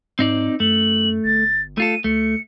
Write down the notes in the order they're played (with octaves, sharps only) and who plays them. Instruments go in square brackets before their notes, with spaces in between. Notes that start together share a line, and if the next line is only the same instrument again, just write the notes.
[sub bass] G#2 [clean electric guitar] C4 D#4 D5
[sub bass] F#2 [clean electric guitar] A3 [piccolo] F#7
[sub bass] G1 [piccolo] A6
[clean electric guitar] A3 F4 A4 [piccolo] D#7
[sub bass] D2 [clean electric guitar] A3 [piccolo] C#7